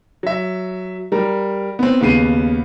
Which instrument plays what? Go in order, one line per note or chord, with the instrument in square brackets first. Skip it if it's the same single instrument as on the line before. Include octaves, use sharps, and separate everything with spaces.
[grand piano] F#3 E5
G3 A#4
B3 C4
D#2 C#3 B3 C7 D#7